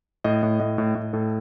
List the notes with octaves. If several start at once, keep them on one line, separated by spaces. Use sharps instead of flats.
A2 D#5
A2
A2 D#5
A2
A2
A2 A4